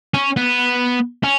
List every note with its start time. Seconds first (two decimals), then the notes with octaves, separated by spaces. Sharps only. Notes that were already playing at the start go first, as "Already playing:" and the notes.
0.14 C#4
0.37 B3
1.24 C#4